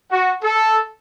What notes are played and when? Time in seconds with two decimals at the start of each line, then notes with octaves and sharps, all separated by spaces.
0.10 F#4
0.42 A4